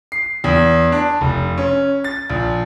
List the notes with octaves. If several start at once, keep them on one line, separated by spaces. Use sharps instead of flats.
C7
E2
D4
F1
C#4
A6
A#1